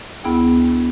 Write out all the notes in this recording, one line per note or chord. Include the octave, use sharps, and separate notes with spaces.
D2 B3 E4 G#4 G5